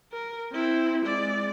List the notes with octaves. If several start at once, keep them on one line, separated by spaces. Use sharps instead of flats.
A#4
C4 E4
G#3 D5